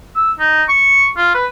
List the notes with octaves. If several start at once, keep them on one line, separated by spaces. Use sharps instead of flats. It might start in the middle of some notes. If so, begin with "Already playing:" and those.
E6
D#4
C#6
F4
B4